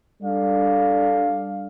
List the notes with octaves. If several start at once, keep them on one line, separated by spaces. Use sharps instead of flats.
G3 D4 A4 D5 F5